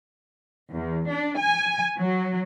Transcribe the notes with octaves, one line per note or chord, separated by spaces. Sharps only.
E2
D4
G#5
F#3